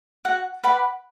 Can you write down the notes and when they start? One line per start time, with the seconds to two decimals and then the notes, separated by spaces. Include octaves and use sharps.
0.25 F#4 F#5
0.64 B4 D5 F#5 B5